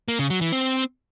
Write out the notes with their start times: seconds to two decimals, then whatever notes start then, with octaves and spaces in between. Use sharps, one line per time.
0.08 A#3
0.19 C#3
0.30 F#3
0.41 E3
0.52 C4